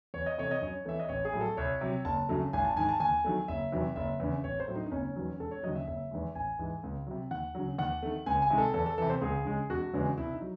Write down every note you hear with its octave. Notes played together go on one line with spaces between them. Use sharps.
E2 C#5
D#5
C3 E3 A3 C#5
D#5
F#2 C#5
E3 A3 E5
D#5
A1 C#5
G#4
A2 F#3
A4
C2 C#5
C3 F#3
F#1 A5
F#2 C#3 F#3 A3
G#1 G#5
A5
G#2 D#3 G#5
A5
D#2 G#5
D#3 F#3 A3
F#1 E5
E2 C3 D#3 F#3
F#1 E5
E2 C#3
A1 C#5
C5
A2 F#3
D#4
D#4
F#1 C#4
E2 D#3 F#3
E1 A4
C#5
D#2 C#3 F#3 D#5
E5
F#1 E5
E2 D#3 G#3
A1 G#5
G#2 E3 G#3
C#2
C3 F#3
D#2 F#5
C#3 F#3
D#2 F#5
D#3 A3
C#2 G#5
G#5
C3 D#3 G#3
A4
E2 A4
A4
C3 E3 A4
C5
C#2 G#4
C#3 G#3
E1 F#4
E2 C#3 E3 G#3
C2 E4
D#4
F#3